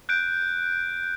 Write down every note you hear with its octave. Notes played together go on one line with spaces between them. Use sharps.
F#6 G6 D7